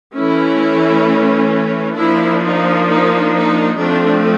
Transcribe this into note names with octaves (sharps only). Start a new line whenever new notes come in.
E3 A3 C#4 E4
F3 A#3 D4 E4
D#4
D#4
D#4
F3 A3 C4 D4